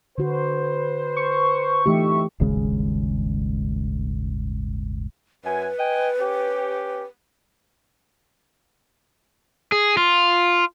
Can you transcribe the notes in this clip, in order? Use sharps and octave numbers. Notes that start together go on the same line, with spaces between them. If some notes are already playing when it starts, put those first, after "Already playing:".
D3 F#4 B4 C5
C#6
F2 E3 A3 D#4 G4 E5
D#1 G#1 C#3 G#3
F#2 B4 G#5
D#5 G5 G#5
C#4 G4
G#4
F4